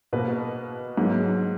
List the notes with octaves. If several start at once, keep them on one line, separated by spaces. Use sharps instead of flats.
B2 A#3 B4
G#2 F#3 A#3